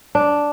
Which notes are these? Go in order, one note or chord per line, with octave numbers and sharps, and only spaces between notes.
D4